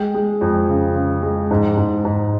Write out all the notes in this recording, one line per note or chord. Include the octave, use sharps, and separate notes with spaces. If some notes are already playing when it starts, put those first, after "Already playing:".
Already playing: G#3 G5
G#3
F2
C#3
C#3
G#3
G#2
G#2
G#2